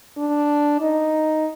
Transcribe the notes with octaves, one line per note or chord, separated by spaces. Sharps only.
D4
D#4